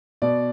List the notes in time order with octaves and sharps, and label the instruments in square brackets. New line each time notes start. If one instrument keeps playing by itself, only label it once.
[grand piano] B2 D5